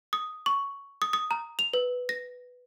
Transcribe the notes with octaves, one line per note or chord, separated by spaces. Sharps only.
D#6
C#6
D#6
D#6
A#5
F7
B4
A#6